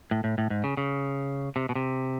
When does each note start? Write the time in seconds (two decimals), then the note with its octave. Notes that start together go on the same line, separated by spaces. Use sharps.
0.11 A2
0.24 A2
0.38 A2
0.50 G#2
0.64 C#3
0.77 C#3
1.56 C3
1.69 B2
1.75 C3